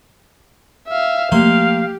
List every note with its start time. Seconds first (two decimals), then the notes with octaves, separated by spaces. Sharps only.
0.88 E5 F5
1.32 F3 A3 A#3 G4 F5 C6